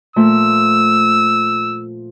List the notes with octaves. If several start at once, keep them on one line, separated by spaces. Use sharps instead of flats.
A#2 F3 A3 E6